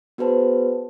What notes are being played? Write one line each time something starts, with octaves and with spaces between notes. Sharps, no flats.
B3 F#4 G#4 B4 C5 A5